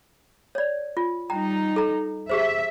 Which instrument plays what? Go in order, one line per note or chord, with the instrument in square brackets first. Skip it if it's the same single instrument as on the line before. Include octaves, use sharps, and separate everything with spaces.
[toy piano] C#5 D5
F4
[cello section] G3 D#4 [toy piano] G5 A#5
[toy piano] A4 A#5
[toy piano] G4 G#4 C5 [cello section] E5